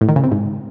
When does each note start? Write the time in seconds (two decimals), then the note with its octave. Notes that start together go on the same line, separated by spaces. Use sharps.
0.01 A2
0.09 D#3
0.16 C#3
0.24 C3
0.31 G#2